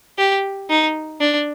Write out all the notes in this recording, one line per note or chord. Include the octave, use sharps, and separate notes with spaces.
G4
D#4
D4